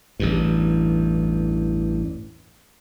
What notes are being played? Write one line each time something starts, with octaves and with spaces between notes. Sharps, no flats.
A1 E2 G2